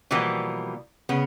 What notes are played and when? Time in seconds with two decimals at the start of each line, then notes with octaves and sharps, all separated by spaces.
0.11 B2 E3 F3 G3 A#3 B3
1.09 C#3 B3